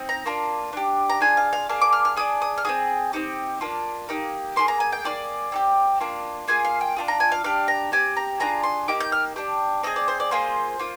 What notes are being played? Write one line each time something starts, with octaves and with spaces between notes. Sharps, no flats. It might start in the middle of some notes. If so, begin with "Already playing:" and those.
Already playing: C4 D#4
A#5
A#3 D4 F4
D4 G4
A#5
D4 F4 G#4 G#5
F5
F5
A#3 D4 G#4 F5
D6
F6
F6
D4 G#4 D#6
D#6
F6
C4 F4 G#4 D#6
C4 D#4 G4
A#3 D4 F4
A#3 D#4 G4
A#3 F4 G#4 C6
A#5
G#5
G5
A#3 F4 G#4 D5
C4 D#4 G4
A#3 D4 F4
A#3 F4 G#4 G#5
F5
G5
D4 F4 G#4
A#5
G#5
F5
D4 G4 F5
A#5
C4 G4 G#5
A#5
D4 F4 G#4 A#5
C6
A#3 D#4 G4 D6
G6
F6
D4 G4
C4 D#4 G#4 D#5
D5
C5
D5
A#3 F4 G#4 C5
A#3 F4